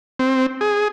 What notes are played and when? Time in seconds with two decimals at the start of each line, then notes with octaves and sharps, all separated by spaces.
0.19 C4
0.61 G#4